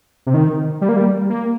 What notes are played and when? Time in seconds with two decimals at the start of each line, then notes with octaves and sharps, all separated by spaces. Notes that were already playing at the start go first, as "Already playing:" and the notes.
0.26 C3
0.34 D#3
0.81 G3
0.89 A#3
0.96 G3
1.30 A#3